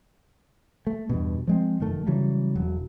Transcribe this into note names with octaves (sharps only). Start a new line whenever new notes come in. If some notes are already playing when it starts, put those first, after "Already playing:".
A3
E2 G2 B2
F3 G#3 C4
F1 F#2 D#3 A3
C#3 E3 F#3 G3
E1 F#3